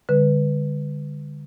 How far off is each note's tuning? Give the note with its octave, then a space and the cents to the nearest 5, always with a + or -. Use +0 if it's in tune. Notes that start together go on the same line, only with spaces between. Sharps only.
D3 +0 G3 +45 B4 +0